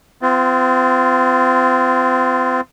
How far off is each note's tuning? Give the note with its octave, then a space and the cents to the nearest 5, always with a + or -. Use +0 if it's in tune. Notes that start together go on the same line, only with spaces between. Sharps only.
C4 -35 F4 -15